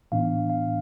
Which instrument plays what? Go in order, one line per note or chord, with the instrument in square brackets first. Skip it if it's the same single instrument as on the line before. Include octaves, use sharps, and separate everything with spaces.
[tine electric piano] A2 E3 B3 D4 F5
F5